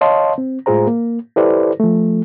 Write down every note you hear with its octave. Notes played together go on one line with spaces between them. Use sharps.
C#5 D#5 F5 A5 C6
C4
A2 G#3 F4 G#4 C5 A#5
A#3
E4 G4 A4 B4 C5 D5
F3 A3